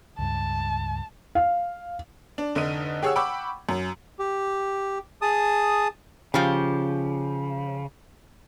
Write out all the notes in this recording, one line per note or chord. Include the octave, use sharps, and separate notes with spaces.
C#2 G2 A5
F5
D4
F1 D3 D#4 D#5 D#7
G4 G#4 C#5 F#5 E6
F#5 G5 B5 C#6 D6 E6
F#2
G4
G#4 A5 D#6
C#3 F3 G4